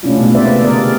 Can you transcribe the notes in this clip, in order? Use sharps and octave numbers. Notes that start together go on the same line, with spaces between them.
C3 A3 C#4 D4 E4 F4
B2 G#3 A3 B3
G#3 A#3 B4 C5 D5 E5
C3
D3 B3 D4 A#4 D5 D#5
G#4